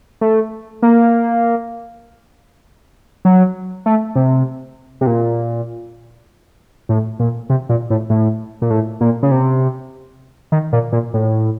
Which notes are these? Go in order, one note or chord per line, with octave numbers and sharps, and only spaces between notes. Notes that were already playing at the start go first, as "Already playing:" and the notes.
A3
A#3
F#3
A3
C3
C3
A#2
A2
A#2
C3
A#2
A2
A2
A#2
A2
A#2
C#3
C3
D#3
A#2
A#2
A2